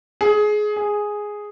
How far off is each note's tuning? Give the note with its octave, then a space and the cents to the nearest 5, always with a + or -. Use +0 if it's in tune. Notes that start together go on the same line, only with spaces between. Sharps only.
G#4 +20
G#4 +0